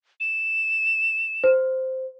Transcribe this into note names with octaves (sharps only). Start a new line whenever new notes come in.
E7
C5